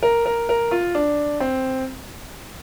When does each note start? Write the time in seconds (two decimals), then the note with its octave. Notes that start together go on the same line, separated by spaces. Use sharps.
0.03 A#4
0.26 A#4
0.49 A#4
0.71 F4
0.95 D4
1.40 C4